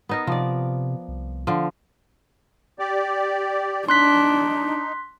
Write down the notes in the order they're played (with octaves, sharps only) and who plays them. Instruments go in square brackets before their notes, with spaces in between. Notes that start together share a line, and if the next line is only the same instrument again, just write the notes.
[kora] B3 D#4 A#4
[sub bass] C3 [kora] F3 D5
[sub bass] C2
[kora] D3 F3
[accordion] G4 D5
[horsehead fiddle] D4 [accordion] D#4 [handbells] C6 F#6 B6